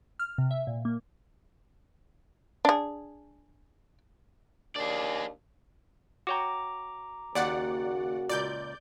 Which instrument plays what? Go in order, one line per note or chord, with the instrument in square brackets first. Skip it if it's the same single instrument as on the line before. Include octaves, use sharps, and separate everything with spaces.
[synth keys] F6
C3
E5
A#2
A#3
[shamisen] D4 G#4
[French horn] D#2 [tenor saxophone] D4 [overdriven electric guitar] G#4 D5
[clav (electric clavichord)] F#4 C#5 G5 [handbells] A#5 D6
[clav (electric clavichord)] D#2 [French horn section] C#3 A#3 F#4 [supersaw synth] D5 F#5
[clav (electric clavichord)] C#2 A#2 [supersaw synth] D5 G6